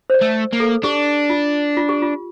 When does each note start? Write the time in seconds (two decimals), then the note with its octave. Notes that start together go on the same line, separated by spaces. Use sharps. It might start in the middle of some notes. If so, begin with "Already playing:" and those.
0.10 C5
0.14 D5
0.22 A3
0.53 A#3
0.60 A4
0.83 D4 G4
1.30 F4
1.77 F4
1.89 G4
2.02 F4